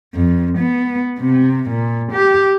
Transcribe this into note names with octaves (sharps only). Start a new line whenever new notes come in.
F2
B3
C3
A#2
G4